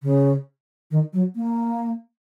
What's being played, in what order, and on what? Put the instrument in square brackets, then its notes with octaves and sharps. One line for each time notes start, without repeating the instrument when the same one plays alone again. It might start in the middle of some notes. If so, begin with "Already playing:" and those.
[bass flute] C#3
D#3
F#3
A#3